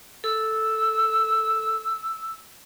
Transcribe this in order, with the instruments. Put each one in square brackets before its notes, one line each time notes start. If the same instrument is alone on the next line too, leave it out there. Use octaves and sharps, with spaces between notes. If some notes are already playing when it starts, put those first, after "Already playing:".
[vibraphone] A4 [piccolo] E6